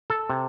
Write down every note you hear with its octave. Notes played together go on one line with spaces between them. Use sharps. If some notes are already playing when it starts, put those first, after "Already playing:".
A4
C3